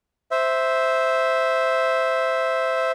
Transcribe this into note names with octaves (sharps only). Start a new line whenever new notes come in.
C5 E5